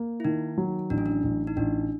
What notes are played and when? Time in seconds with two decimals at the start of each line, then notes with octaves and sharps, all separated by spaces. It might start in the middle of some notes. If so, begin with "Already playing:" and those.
Already playing: A#3
0.20 E4
0.25 D#3 D#4
0.58 F#3
0.90 A1 D4
0.98 C#4
1.06 D4
1.24 A1
1.47 D#4
1.57 A1 D4